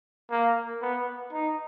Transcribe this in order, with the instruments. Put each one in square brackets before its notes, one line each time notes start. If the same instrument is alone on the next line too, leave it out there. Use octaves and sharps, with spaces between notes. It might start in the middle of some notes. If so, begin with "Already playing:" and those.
[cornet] A#3
B3
D#4